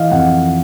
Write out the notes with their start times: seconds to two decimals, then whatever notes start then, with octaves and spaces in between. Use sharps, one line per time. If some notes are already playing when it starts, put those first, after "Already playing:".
Already playing: E3 D#5 F5
0.11 F2 F#5